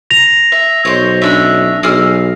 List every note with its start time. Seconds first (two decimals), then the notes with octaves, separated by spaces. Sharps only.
0.10 A#6 F7
0.52 E5
0.85 B1 C5 C#5
1.22 C#4 D4 E5
1.83 B1 G#4 E6 F6